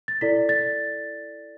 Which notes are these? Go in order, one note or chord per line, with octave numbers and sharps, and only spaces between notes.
A6
E4 A4 D5 B6
A6